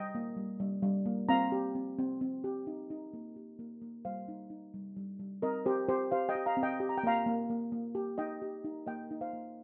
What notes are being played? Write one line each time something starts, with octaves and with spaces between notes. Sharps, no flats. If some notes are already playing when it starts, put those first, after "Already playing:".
Already playing: G3 D#5 G5
A#3
G3
G3
G3
A#3
C4 F5 A#5
G4
C4
C4
C4
G4
D#4
D#4
A#3
G4
A#3
A#3
G3 C5 F5
D#4
D#4
G3
G3
G3
C4 A#4 D#5
C4 G4 C5
C4 G4 C5
G4 C5 F5
D#5 G5
G4
F5 A#5
C4
D#5 G5
G4
A#5
G5
A#3 F5 A#5
A#3
A#3
A#3
G4
D#4 D#5 G5
G4
D#4
A#3 D#5 G5
D#4
C5 F5
A#3